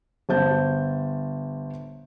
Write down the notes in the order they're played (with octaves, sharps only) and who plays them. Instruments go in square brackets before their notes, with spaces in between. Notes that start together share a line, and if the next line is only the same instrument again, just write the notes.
[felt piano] G1 C5 A5 G6